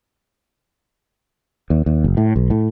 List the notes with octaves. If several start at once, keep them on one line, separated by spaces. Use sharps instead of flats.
D#2
D#2
F#1
A2
B1
A2